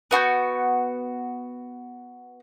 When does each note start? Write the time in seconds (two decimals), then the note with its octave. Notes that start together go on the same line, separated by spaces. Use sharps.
0.11 B3 F#4 C6 G6